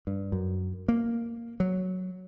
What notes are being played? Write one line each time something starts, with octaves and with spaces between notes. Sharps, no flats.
G2
F#2
A#3
F#3